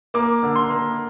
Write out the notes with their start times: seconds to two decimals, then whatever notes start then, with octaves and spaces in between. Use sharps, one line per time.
0.14 A#3 D6
0.43 D3
0.56 C6
0.70 A#3